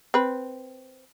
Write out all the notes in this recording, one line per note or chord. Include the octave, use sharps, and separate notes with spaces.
C4 B4